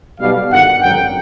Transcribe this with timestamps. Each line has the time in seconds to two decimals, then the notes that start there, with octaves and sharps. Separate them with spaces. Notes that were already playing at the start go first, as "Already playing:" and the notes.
0.20 B1 B2 G3 F5
0.51 G1 G2 D#3 F#5
0.81 G#1 F#2 D3 F#3 G5